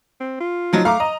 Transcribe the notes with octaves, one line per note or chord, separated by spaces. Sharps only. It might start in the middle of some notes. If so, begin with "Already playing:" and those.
C4
F4
F3 F#3 D#4
A3 F5 A#5 D6
D#5 A#5